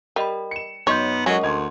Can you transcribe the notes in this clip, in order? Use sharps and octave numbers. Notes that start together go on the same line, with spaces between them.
G3 A#4 D#5 B5
C#7 E7
F#2 B3 D#4 C#5 C6 G6
F#3 G#3 C#4 F#4 A#4 D#5 C#6
D2 D#5 F#5 C6 G#6